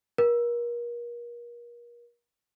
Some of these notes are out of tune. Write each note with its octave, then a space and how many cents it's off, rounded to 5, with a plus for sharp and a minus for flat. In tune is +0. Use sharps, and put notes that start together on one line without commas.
A#4 +35